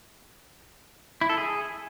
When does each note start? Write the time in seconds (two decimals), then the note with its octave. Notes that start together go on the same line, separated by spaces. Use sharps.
1.21 E4
1.29 A4
1.38 G#4